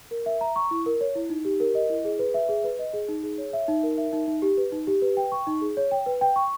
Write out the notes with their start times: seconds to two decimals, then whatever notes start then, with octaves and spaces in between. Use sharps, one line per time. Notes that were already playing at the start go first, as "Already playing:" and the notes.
0.11 A#4
0.26 E5
0.41 A#5
0.56 C#6
0.71 E4
0.86 A#4
1.01 C#5
1.15 E4
1.30 D#4
1.45 G4
1.60 A#4
1.75 D#5
1.90 E4
2.05 G#4
2.19 B4
2.34 E5
2.49 G#4
2.64 B4
2.79 D#5
2.93 G#4
3.08 D#4
3.23 G#4
3.38 C#5
3.53 E5
3.68 D#4
3.83 A#4
3.98 E5
4.13 D#4
4.27 D#4
4.42 G4
4.57 B4
4.72 D#4
4.87 G4
5.02 B4
5.17 G5
5.32 C#6
5.47 D#4
5.61 G#4
5.77 C#5
5.91 G5
6.06 B4
6.21 G5
6.36 C#6